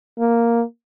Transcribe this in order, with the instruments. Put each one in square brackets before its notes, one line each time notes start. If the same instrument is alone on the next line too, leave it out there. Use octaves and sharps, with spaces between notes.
[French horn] A#3